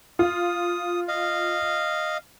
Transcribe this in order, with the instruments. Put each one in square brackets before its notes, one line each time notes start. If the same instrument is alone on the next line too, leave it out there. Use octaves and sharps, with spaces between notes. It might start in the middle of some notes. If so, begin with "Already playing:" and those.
[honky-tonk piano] F4 [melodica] D#6
[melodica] D#5 F5